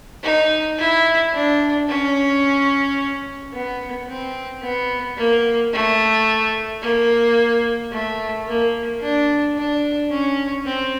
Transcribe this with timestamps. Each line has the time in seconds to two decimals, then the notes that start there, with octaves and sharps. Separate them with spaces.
0.24 D#4
0.78 E4
1.33 D4
1.88 C#4
3.53 B3
4.08 C4
4.63 B3
5.17 A#3
5.73 A3
6.82 A#3
7.92 A3
8.47 A#3
9.01 D4
9.55 D4
10.10 C#4
10.65 C4